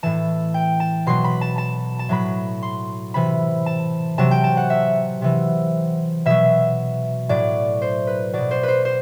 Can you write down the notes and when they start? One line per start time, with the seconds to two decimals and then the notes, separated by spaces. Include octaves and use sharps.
0.03 A2 E3 A5
0.54 G5
0.80 A5
1.06 B2 F#3 C6
1.24 B5
1.41 A5
1.58 A5
1.99 A5
2.09 A2 F#3 B5
2.62 C6
3.14 C3 E3 B5
3.66 A5
4.18 C3 F#3 A5
4.31 G5
4.44 A5
4.57 F#5
4.70 E5
5.22 C3 E3
6.26 B2 F#3 E5
7.29 A2 F#3 D5
7.82 C5
8.07 B4
8.33 B2 F#3 D5
8.51 C5
8.63 B4 C5
8.85 C5